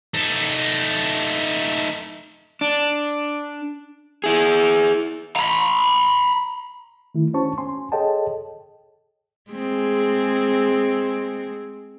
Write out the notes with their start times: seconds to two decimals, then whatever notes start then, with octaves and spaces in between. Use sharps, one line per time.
0.14 A3 D#4
2.61 D4
4.24 E4 G#4
5.36 A#5 B5
7.15 D#3 A3 E4
7.34 C#4 D4 F#4 C5 A5 C#6
7.58 C#4 G#5 C6
7.92 G#4 A4 C#5 D#5 G5 A5
9.51 G#3 C4 G#4